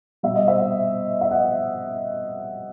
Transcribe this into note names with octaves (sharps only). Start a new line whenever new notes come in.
B2 G3 E5
D#5
C5 E5
E5
D#5 F#5